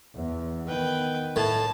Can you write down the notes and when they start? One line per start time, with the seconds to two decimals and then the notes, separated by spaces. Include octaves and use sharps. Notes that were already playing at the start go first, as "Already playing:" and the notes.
0.14 E2
0.67 D#3 B3 B4 G5
1.36 A2 A5